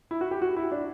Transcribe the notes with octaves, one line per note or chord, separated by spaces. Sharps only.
E4
F#4
G4
F#4
E4
D4